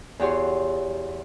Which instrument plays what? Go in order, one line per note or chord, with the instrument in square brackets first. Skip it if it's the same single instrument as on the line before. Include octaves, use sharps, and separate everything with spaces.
[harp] E2 F#4 G4 C#5 C6